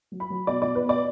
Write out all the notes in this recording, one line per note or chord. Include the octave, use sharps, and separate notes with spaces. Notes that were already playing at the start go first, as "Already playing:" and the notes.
F#3
B5
F#3
B2 D5
B2 D5
B4
B2
D5